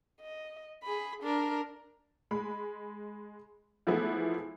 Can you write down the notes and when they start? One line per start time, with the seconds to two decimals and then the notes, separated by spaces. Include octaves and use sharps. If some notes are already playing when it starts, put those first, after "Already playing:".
0.21 D#5
0.83 G#4 B5
1.23 D4 A#4
2.31 G#3 B5
3.87 E3 F3 G#3 A3 B3 E4